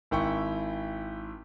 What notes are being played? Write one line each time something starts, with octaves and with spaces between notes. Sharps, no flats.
G#1 E4 G5 C#6